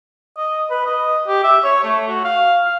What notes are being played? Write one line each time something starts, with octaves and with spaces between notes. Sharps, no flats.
D#5
B4
D#5
G4
E5
C#5
A3
F#4
F5
F5